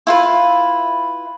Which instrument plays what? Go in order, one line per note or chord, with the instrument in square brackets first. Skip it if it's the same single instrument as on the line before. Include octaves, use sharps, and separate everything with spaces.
[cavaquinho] E4 F4 B4